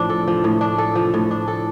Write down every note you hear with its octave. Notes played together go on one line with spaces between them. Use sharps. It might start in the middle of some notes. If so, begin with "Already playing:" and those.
Already playing: A2 F3 D4
A4
F3
A2
D4
A4
F3
A2
D4
A4